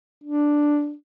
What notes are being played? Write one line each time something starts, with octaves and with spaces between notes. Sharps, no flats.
D4